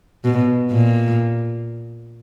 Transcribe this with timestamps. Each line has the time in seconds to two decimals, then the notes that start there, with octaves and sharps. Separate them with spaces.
0.25 B2
0.71 A#2